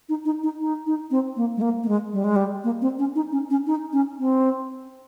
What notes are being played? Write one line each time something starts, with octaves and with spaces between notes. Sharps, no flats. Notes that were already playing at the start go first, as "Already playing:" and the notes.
D#4
D#4
D#4
D#4
D#4
C4
A#3
G#3
A#3
A#3
G#3
G3
G#3
G3
A#3
C4
C#4
D#4
C#4
C#4
D#4
C#4
C4